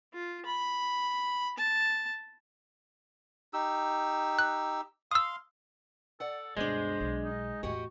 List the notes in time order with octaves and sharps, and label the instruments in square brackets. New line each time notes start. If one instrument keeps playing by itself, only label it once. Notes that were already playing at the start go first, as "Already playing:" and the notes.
[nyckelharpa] F4
B5
A5
[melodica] D#4 G4 E6
[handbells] F#6
[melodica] F5 C6 [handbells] D#6 E6
[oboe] A4 [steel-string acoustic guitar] D5 F#5
[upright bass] D2 G2 [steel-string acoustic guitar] B2 D4 [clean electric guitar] G#3 [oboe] C5
[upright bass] B1
[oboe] D#4
[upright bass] E2 A2 [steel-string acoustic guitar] F#4 G4 D#5 [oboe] C#6